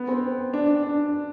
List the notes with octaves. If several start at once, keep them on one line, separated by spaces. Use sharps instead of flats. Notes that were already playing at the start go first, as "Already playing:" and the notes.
Already playing: B3
C4
D4
D4